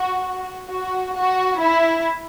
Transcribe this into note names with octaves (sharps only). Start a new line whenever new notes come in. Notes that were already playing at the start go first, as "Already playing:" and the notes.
Already playing: F#4
F#4
F#4
E4